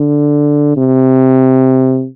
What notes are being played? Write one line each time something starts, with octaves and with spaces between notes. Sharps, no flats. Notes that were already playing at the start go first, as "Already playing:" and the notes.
Already playing: D3
C3